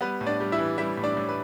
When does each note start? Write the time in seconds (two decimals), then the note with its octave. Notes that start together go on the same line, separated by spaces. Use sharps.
0.01 G3 B3 B4
0.21 A2
0.27 D4 D5
0.40 G3
0.52 E4 E5
0.58 E3
0.78 G3 E4 E5
0.97 A2
1.04 D4 D5
1.17 A2
1.29 B4